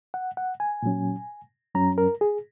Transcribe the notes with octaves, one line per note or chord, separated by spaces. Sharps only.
F#5
F#5
G#5
A#2 F#3 C#4
F#2 F#3 C#4 A#5
A#4
G#4